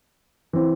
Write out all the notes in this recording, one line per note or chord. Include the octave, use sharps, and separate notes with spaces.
E3 C4